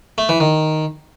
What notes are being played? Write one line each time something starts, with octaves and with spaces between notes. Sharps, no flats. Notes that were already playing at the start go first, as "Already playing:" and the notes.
A3
E3
D#3